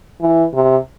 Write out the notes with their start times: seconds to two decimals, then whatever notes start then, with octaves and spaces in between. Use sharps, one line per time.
0.21 E3
0.54 C3